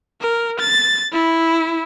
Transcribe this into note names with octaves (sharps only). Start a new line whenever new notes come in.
A#4
A6
E4